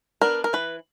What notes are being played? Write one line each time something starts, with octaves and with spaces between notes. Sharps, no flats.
B3 D4 A#4
A#4
E3 B4